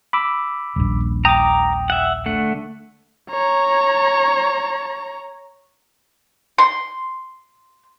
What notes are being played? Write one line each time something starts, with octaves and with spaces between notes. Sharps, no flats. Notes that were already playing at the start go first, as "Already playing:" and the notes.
B5 D6 E6
D#1 A#1
G5 A#5 D6 D#6
E5 F#5
D3 A3 F#5
C#5 A#5
C6